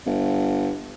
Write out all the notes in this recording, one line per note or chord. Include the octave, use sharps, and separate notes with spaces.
G1